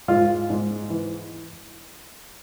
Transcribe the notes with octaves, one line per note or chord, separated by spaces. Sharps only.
G#2 F4
G#2
E3